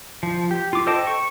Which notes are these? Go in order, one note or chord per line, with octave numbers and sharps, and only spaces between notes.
F3
G4
F4 D6
A4 C5 D#5 G5 A5
C#6